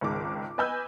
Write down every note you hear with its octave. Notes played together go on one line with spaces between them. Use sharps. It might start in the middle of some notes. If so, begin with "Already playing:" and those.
G#1 C#2 D#3 G#3 D6
B4 D#5 G#5 B5 E6 G6